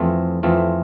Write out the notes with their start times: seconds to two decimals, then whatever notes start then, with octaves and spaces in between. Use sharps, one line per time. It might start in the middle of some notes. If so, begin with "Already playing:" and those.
Already playing: F2 E3 A3 C4 F4
0.43 F2 E3 A3 C4 F4